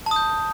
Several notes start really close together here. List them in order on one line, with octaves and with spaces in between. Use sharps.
A5 D#6 G6